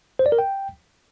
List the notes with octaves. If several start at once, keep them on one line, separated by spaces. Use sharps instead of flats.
C5
D5
A#4
G5